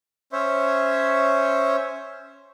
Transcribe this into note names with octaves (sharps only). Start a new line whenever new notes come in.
C#4 C5 C#5 E5